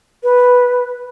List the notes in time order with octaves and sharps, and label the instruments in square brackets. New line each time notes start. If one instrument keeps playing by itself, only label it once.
[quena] B4